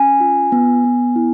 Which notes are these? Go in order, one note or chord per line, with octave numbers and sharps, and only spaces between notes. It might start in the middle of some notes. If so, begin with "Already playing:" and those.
Already playing: C#4 G#5
F4
B3
B3
E4